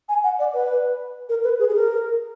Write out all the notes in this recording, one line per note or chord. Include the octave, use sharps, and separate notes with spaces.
G#5
F#5
D5
B4
A#4
B4
G#4
G#4
A#4